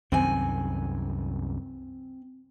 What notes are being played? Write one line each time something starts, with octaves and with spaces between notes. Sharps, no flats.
C2 F#2 D#3 C4 G#5